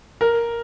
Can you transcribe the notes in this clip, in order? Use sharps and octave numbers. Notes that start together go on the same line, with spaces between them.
A#4